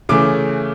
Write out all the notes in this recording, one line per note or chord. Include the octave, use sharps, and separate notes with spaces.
C#3 E3 A3 D6